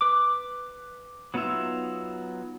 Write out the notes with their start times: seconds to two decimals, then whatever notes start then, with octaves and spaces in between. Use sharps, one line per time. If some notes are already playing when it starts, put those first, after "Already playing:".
0.01 B4 D6
1.34 F#3 B3 D#4 F4 E5